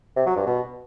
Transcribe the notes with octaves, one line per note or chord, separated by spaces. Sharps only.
C3
F#3
G2
B2